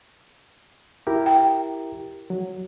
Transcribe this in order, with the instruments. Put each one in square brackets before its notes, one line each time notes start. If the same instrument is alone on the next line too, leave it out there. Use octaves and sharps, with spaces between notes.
[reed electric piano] E4 G4 A#4
[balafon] G5
[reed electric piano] F#3